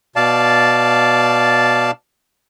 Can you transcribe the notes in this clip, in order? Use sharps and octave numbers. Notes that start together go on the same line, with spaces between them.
B2 D5 F5 A5